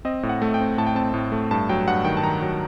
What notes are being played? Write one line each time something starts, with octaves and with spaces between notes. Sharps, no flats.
C4 D#5
A2
F#5
A3
G5
C4
A2 A5
G5
C4 A5
A2
A3
G2 A5
F#3 G5
G2 F#5
D#3 G5
A5
D#3 A#5
F#3